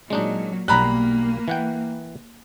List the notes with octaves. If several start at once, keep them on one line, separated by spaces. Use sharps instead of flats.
A#2 F#3 G#3 D4 D#4
B1 G3 A#3 A#5 B5 F#6
E3 F#5 G5